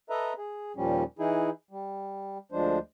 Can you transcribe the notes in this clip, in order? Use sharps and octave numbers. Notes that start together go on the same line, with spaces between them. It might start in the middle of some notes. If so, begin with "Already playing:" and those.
A4 B4 D#5 E5 A#5
G#4
D#2 A#2 F3 G3 C#4
E3 D#4 E4 G#4
G3
D2 F3 G#3 D4 C5